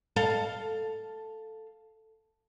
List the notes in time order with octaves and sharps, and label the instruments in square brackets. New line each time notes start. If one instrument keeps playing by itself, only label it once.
[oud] A4 F5